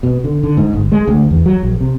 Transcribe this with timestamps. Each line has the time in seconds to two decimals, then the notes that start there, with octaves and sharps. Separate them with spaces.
0.03 B2
0.24 D3
0.43 D3
0.57 G#2
0.73 G1
0.92 G#3
1.08 D2
1.31 E2
1.46 F#3
1.63 A#1
1.81 C3